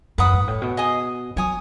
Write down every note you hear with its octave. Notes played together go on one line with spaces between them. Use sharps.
F#2 B4 F#5 B5 D#6
G#2
A2
B2
G#4 D#5 G#5 D#6
F#3 C#5 G#5 D#6